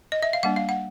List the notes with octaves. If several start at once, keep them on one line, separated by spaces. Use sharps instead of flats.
D#5
E5
F5
G3 A#3 D4 F#5
F5
F#5